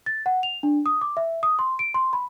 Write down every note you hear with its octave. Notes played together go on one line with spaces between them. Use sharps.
A6
F#5
F7
D4
D#6
D6
E5
D#6
C6
D7
C6
B5